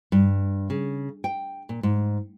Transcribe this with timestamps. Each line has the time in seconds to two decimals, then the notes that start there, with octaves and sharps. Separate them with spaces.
0.12 G2
0.70 C#3
1.24 G5
1.69 A#2
1.83 G#2